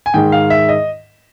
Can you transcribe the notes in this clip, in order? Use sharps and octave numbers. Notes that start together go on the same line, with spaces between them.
G#5
G#2 D#3 G#3 G5
F5
E5
D#5